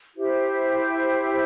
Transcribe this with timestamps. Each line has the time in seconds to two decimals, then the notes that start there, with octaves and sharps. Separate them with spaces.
0.15 E4 G4 C5 E5